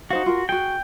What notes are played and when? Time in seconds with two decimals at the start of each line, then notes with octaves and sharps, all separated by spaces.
0.11 D#4 F#4 C5 F5
0.26 F4 A#4
0.49 F#4 G#4 G5